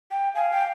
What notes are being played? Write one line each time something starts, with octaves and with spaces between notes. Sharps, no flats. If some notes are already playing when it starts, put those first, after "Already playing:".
G5
F5 G#5
G5